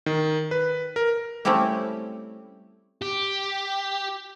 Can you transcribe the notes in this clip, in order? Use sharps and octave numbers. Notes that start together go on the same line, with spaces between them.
D#3
B4
A#4
G3 A3 C4 C#4 E4 G4
G4